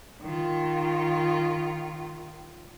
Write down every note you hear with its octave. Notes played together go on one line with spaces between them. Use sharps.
D#3 F4